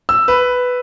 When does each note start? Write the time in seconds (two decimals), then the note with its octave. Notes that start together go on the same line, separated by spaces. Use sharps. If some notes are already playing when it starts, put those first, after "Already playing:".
0.09 E6
0.28 B4